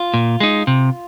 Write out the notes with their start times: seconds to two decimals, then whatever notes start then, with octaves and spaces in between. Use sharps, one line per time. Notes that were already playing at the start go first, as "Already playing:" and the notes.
Already playing: F4
0.14 A#2
0.40 G#3 D#4
0.67 C3